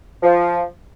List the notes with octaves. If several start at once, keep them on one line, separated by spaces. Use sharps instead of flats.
F3